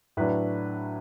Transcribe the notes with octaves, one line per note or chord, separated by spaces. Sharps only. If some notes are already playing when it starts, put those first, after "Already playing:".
A2 F#3 D4 B4